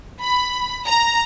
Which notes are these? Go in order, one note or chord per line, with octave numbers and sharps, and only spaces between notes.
B5
A#5